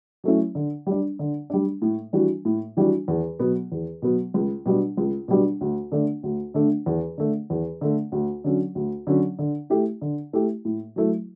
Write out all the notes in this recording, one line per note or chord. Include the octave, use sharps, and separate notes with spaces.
F#3 A3 C#4 E4
D3
G3 D4
D3
G3 D4
A2
E3 G3 D4 F#4
A2
E3 G3 D4 F#4
E2
B2 F#3 B3
E2
B2 F#3 B3
C#2
B2 G3 D4
C#2
B2 G3 D4
D2
D3 A3 D4
D2
D3 A3 D4
E2
D3 A3
E2
D3 A3
D2
D3 F#3 C#4
D2
D3 F#3 C#4
D3
A3 E4 G4
D3
A3 E4 G4
A2
F#3 A3 E4